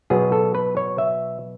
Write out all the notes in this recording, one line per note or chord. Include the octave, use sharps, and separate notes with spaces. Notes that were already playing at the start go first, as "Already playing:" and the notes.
B2 F#3 B3 G#4
A4
B4
C#5
E5